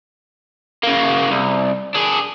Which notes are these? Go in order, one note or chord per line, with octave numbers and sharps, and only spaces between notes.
C#3 A#3
C2
D4 G#4